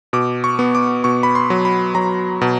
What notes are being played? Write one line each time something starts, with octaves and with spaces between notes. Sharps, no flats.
B2 D6
C#6
B3
D6
B2 C#6
B5
C6
F#3
B5
F#3 A#5
B2